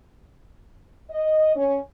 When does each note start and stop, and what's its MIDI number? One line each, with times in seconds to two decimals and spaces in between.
1.10 1.53 75
1.56 1.78 61